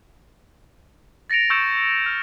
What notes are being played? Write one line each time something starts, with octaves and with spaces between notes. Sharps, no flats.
A6 A#6 C#7 D7 F7
C#6 E6 G6 C#7 D7 E7
F6